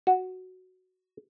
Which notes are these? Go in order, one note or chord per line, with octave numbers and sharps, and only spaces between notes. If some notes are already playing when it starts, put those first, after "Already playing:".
F#4